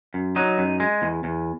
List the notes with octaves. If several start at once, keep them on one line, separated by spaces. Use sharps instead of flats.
F#2
F#3 D#4
F#2
G#3
E2
E2